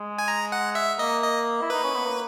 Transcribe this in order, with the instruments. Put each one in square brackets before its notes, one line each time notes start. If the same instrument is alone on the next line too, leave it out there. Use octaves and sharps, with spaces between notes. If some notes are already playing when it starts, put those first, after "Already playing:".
Already playing: [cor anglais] G#3
[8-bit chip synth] G#5
A#5
F#5
E5
[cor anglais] A#3 [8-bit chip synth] D#5
[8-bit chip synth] D#5
[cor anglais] E4
[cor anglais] D#4 [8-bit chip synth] B4
[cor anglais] C#4
B3
A#3